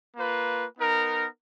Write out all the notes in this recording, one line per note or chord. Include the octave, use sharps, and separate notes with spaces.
A#3 F4 B4
B3 D#4 A#4